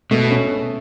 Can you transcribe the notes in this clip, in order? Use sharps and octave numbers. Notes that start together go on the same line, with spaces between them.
B2 A3
C#4